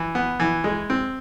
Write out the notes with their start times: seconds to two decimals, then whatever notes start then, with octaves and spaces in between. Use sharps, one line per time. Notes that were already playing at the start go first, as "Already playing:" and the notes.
Already playing: E3
0.15 B3
0.40 E3
0.64 G#3
0.90 C4